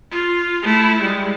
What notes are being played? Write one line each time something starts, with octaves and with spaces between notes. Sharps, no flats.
F4
A3 E4
G3 G#3